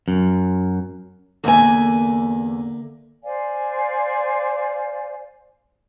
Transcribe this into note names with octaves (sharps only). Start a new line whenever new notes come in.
F#2
E2 D3 A#3 E5 G#5
C5 D5 F5 G#5